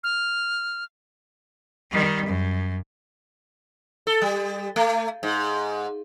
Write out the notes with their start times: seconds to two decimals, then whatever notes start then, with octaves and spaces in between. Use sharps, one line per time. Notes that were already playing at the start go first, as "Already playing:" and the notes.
0.04 F6
1.91 D#3 G3
2.26 F#2
4.07 A4
4.22 G3
4.76 A3
5.23 G#2